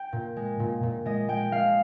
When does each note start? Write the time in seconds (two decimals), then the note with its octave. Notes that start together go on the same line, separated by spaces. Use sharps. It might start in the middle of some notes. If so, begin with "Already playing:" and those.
Already playing: G5
0.13 A#2
0.36 G#3
0.60 A#2
0.83 A#2
1.06 G#3 D#5
1.28 G#3 G5
1.52 G#3 F5